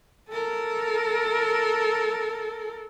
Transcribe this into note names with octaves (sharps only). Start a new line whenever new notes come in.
A4 A#4